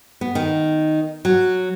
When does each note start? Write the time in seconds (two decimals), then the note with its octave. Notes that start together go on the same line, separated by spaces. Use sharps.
0.21 B3
0.35 D#3
1.25 F#3